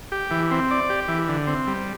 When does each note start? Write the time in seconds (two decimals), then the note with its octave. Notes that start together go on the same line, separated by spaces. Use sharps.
0.12 G4
0.31 E3
0.51 C4
0.71 D5
0.89 G4
1.08 E3
1.28 D3
1.47 C4
1.67 G3